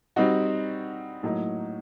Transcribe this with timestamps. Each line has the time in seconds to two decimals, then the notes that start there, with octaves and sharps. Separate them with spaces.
0.16 G3 C4 D#4 F#4
1.23 A2 F#3 A#3 D#4